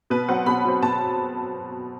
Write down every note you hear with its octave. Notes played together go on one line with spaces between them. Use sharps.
B2 B4
F#3 C4 F#5
B2 B5
F#3 C4
B2 A5